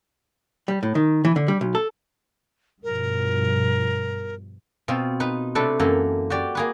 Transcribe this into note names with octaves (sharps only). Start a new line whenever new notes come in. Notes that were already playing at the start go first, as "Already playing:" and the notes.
G3
A2
D#3
E3
D3
G3
B1
A4
G2 B2 F3 A#4
B2 C4 F4
D#4 B4
C3 A3 D4 A4 B4
F#2 E3 A#3 A4
F#4 G4 D5
A#3 G#4 B4